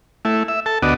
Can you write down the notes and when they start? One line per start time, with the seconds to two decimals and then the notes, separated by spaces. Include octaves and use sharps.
0.25 A3 E4
0.48 E5
0.66 A4 A5
0.83 D2 B3 F#4 D5 D#5